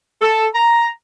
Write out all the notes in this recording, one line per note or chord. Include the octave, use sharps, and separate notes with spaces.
A4
A#5